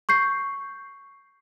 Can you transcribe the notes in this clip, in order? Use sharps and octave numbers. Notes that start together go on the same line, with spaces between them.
C#6 G6 C7